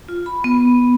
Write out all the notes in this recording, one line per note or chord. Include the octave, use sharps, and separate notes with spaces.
F4
B5
B3